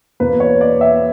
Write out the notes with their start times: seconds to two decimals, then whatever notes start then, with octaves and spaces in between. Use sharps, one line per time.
0.20 E2 B2 A#3 B4
0.40 C#5
0.61 D5
0.81 E5